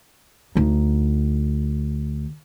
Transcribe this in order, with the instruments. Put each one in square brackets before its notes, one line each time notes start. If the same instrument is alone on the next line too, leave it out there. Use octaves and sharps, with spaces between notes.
[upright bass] D2 D#4